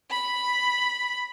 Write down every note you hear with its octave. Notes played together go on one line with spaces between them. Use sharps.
B5